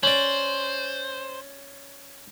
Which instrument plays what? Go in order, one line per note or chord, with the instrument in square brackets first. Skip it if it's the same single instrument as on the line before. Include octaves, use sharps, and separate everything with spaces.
[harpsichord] C#4 D5 [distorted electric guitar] C5 [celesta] F#7